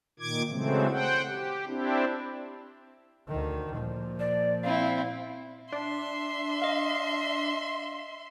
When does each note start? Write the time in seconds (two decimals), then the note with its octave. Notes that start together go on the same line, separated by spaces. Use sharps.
0.20 A#2 D#3 D6 G#6
0.50 C#3 E3 F#3 G#3 A3 C4
0.91 C5 F#5 G5
1.28 G4
1.67 C4 D4 E4 G4
3.28 D2 D#3
3.74 A#2 F3
4.19 D5
4.64 C4 E4 F5
5.73 D4 E5 C6
6.62 D#5 F5